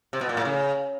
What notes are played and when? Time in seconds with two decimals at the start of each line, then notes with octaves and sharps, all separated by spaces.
0.13 C3
0.21 B2
0.29 A#2
0.37 A2
0.45 C#3